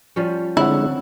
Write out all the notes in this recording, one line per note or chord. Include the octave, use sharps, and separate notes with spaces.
F3 G3 C#4
D3 G#3 C4 D4 E4 C#5 F#5